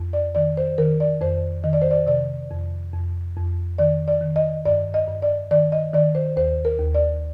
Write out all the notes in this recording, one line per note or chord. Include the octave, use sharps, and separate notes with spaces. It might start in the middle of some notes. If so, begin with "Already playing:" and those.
Already playing: F2
D5
D#3 D5
C5
D#3 A#4
D5
F2 C5
D#3 D#5
D5
C5
D5
C3 D5
F2
F2
F2
D#3 D5
D5
D#3
D#5
G2 D5
D#5
G2
D5
D#3 D5
D#5
D#3 D5
C5
D#2 C5
A#4
D#2
D5